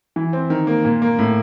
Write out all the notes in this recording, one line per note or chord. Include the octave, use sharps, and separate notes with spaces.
E3
C4
D#3
A#3
A#2
A#3
A2